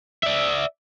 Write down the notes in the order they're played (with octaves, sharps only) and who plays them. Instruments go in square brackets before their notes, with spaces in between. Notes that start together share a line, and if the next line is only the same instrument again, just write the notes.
[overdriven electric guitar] D5 E5